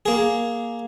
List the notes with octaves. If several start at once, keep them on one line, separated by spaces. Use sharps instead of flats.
A#3 G#4